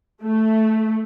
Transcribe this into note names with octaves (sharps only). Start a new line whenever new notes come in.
A3